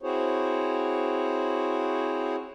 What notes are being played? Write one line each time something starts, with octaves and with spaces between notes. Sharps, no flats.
C4 E4 F#4 G#4 C5 C#5